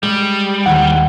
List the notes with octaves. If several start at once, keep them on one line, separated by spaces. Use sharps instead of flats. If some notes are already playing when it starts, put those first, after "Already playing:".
G3 G#3
D#2 D#3 F#5